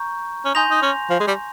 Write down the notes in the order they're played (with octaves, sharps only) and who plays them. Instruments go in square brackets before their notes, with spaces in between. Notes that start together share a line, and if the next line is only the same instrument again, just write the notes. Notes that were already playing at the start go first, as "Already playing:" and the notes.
Already playing: [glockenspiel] A#5 C#6 G6
[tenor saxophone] C#4
[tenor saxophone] D#4 [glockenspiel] G#5 C6 G6 A#6 F7
[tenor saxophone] D#4
C#4
F3
G#3
G3